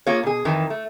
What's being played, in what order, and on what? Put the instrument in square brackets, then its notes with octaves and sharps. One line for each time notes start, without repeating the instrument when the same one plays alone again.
[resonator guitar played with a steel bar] A#3 F4 G#4 C#5
B2 G#4
F2 D#3 E3
A3